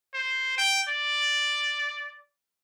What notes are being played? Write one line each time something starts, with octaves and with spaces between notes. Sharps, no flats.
C5
G5
D5